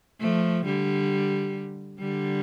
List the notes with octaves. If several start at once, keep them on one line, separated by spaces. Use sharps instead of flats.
F3 A3
D3 G3
D3 G3